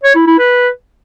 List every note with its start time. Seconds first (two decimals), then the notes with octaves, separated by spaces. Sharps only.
0.04 C#5
0.15 E4
0.27 E4
0.39 B4